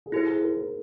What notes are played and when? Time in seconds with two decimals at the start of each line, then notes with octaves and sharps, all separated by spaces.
0.06 G#4
0.12 E4 G4 A4 C5
0.26 G#4
0.41 A#4
0.57 A#4